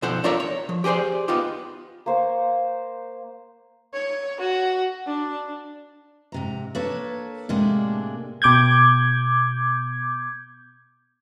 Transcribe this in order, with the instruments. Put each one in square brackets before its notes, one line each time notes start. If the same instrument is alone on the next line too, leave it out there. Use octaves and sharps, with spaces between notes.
[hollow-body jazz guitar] B1 F3 A4 C5 F#5
D4 F4 A#4 C#5 E5
C#5
F3
G4 G#4 A#4 C5 D5
B3 D#4 F4 G4
[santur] A#3 C5 C#6
[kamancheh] C#5
F#4
D4
[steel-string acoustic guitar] G#2 C3 A#5
A#3 D4 A4 B4 C#5
A2 C3 G#3 A#3 D4
[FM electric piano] B2 D6 G6 G#6